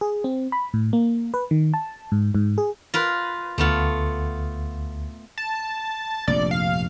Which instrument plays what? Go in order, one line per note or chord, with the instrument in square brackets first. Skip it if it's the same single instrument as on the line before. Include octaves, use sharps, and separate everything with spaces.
[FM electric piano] G#4
C4
B5
A2
A#3
B4
D#3
A5
G#2
G#2
G#4
[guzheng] F4 A#4 B4
[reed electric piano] D2 [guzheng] A3 B3 F4
[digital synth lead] A5
[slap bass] F1 A#1 G2 [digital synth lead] D5
[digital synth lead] F5